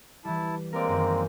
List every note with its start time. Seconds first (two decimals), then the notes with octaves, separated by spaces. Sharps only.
0.25 E3 G3 E4 A5
0.73 G#3 A#3 C4 A#4 D5
0.88 F#2 D#3